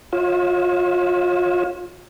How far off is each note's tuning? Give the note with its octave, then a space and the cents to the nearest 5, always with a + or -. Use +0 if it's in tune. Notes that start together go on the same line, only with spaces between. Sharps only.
F4 +30 C#5 -20 E5 -30